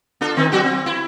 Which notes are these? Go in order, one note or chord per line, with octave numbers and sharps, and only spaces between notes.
D4 F4 A4
D#3 C4 D#4
F#3 F#4 G4
C4
E4